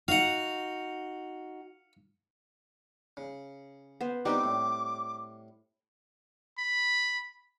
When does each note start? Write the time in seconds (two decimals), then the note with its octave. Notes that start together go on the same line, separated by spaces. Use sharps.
0.08 D#4 F#4 F5 F#5
3.17 C#3
4.01 B3 C5
4.25 G3 B3 C4 D4 D#4 G4 D6
4.44 A2
6.58 B5